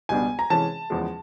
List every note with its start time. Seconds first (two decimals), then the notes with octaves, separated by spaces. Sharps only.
0.09 C#2 B2 G3 B3 D4 G#5
0.39 A#5
0.50 C3 E3 G#3 C#4 A5
0.90 E2 C#3 F3 G#3